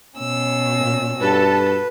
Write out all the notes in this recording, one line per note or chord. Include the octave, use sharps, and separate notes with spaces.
B2 C#4 E6
A#2
G2 F#4 A4 B4 A5